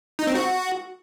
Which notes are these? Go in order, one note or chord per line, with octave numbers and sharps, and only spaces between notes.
D#4
C4
F#4